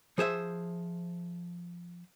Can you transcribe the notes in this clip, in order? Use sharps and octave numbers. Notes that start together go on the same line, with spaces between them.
F3 G#4 C5 E5